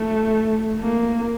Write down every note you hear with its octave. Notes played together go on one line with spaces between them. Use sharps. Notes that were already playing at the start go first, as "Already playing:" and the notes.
Already playing: A3
A#3